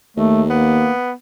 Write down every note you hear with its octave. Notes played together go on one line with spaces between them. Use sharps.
D#2 A3
A#3 B3